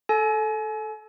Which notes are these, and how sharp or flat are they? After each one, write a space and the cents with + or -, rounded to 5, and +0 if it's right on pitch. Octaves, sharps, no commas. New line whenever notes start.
A4 -10 G#5 +40